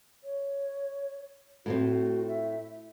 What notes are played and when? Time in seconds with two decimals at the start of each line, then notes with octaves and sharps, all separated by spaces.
0.24 C#5
1.66 A2 A3 C4 F#4
2.28 E5